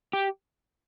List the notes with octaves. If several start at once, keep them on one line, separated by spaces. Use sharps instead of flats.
G4